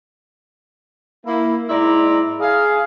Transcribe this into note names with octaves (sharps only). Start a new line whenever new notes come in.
A#3 E4
G#2 G#3 E4 D5 A#5 C6
G#4 F5